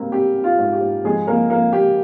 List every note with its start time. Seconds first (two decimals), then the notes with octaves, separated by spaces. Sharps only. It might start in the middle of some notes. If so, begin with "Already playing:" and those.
Already playing: G#2 G3 A#3 C4
0.12 C4 G4
0.36 C4
0.44 F4
0.59 G#2
0.73 G4
0.81 G#2
1.04 F2 G#3 G#4
1.27 F2 A#3 A#4
1.50 F2 A#3 A#4
1.73 A#3 G4